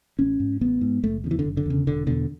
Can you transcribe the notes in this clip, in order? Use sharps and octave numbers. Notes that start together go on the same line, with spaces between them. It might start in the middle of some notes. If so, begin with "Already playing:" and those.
A1 C#4
G#2
A1 B3
G#2
F#1 A3
E2 C#3
E3
D3
F#1
D3
E2 C#3
E1 D3
E2 B2 D3